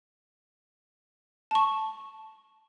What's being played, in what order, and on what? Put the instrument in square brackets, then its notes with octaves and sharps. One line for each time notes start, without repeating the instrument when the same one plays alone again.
[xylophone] A5 C#6